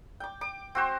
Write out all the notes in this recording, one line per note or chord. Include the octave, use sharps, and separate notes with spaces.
G5 D6
D6
C4 F#4 C5